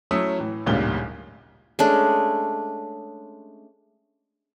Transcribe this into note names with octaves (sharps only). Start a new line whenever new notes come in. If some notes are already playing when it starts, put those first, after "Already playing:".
F#3 A3 C#4 E4 D#6 E6
A2 E3
D1 G#1 A#2 C#3 G3 G7
G#3 A3 C#4 D4